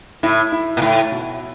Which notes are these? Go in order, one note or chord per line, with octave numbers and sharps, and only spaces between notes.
A2 E4
E4
A#2
A2 E4
B2